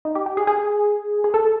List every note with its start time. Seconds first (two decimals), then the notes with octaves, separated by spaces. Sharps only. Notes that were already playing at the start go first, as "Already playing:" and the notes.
0.05 D#4
0.15 G4
0.26 G4
0.37 G#4
0.47 G#4
1.24 G#4
1.34 A4